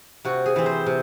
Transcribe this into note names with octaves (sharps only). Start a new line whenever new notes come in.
C3 F#4
G#4
E3 C4
C5
C3